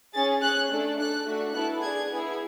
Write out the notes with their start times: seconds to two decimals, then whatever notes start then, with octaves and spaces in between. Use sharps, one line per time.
0.14 C#4 G#4 A6
0.42 C#4 G#4 F#6
0.70 A3 D4 A4
0.98 D4 A4 F#6
1.26 A3 D4 F#4
1.54 B3 E4 A4 F#6
1.83 D4 G#4 G#6
2.10 B3 E4 G#4